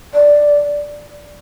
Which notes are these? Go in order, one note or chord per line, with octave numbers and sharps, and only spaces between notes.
D5